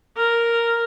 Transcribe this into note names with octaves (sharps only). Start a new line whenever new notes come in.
A#4